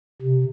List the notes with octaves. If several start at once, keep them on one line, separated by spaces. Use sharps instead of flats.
C3